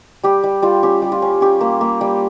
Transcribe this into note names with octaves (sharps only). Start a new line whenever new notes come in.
G3 G4
G3
G3 F4
C#4 G4
G3
F4
C#4
C#4 G4
A#3
A#3
G3